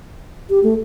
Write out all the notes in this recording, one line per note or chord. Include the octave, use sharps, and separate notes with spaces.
G4
A3